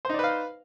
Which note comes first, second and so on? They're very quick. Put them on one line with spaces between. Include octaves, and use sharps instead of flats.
C5 D#4 D5 B4 F5